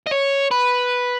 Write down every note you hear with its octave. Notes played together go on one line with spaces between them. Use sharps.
D#5
C#5
B4